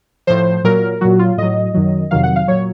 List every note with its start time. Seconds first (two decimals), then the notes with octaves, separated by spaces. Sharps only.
0.27 A2 F3 C5
0.64 A#2 F#3 A#4
1.01 A#2 F#3 F#4
1.19 F4
1.38 A2 F#3 D#5
1.74 F#2 D#3 F#3
2.11 F2 C3 D#3 F#3 F5
2.23 F#5
2.36 F5
2.48 A#2 F#3 C#5